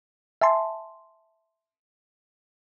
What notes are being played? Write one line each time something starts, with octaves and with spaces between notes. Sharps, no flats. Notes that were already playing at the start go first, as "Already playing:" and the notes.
E5 G#5 A5 C6